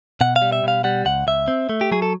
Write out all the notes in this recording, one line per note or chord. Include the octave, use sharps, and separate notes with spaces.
B2 F#5
F5
G3
E5
B2 F5
G3 F#5
C#2 F#5
C#2 E5
C4
A3
G4
F#3 G#4
A4